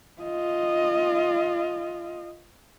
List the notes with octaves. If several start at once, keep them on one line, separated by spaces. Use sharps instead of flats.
F4 D#5